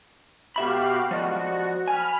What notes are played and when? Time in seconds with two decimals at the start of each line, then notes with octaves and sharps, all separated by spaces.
0.56 B2 F#4 G4 E5 F5 B5
1.11 F3 F#4 D5 D#5
1.88 G#5 B5 F6